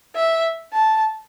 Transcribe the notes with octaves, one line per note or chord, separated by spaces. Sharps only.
E5
A5